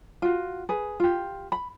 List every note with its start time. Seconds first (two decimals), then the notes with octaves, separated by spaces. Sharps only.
0.22 F4 F#4
0.69 G#4 B4
1.00 F4 G4
1.52 B5